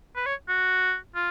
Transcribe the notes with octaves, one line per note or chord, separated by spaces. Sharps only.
B4
C#5
F#4
F4